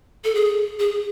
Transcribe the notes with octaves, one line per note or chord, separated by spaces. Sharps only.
A4
G#4
G#4